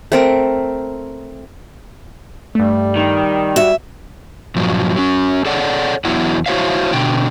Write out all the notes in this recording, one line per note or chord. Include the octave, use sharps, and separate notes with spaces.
A3 C4 A#4
G2 G3 A3
D#3
F#4 E5
G2 A#2 F3 F#3
F#3 C#4
G#4 A4 C#5 D5 F#5
E2 F#3 B3 E4 F#5
E4 F#4 C5 C#5 E5 F5
B2 D3 G5